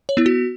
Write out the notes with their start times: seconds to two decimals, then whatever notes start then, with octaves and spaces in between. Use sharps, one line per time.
0.09 C#5
0.17 B3 E4
0.26 F#4